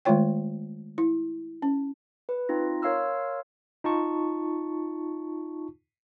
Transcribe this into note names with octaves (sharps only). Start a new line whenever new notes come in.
D#3 G#3 A3 F4 C#5 G5
E4
C#4
B4
C4 D#4 F4 A#6
A#4 C#5 F5 C6 E6 F6
D#4 F4 A5 C#6